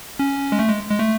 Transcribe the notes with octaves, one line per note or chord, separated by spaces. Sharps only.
C#4
G#3
A3
G#3
G#3
A3